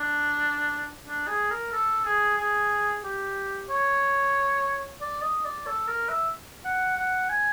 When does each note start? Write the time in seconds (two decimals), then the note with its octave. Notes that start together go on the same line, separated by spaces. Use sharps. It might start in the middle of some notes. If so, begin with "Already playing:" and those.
Already playing: D4
1.06 D4
1.28 G#4
1.51 A#4
1.72 A4
2.05 G#4
2.38 G#4
3.04 G4
3.69 C#5
5.01 D5
5.22 D#5
5.45 D5
5.67 A4
5.88 A#4
6.09 E5
6.65 F#5
6.98 F#5
7.30 G#5